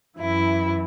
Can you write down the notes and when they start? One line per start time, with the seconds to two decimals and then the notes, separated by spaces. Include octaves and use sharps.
0.19 F#2 E3 E4